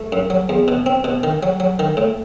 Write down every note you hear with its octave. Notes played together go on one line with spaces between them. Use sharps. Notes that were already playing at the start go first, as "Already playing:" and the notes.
Already playing: A3
F#2
F#3
E2
B2
C4
B2
D#3
F#3
F#3
D#3
A2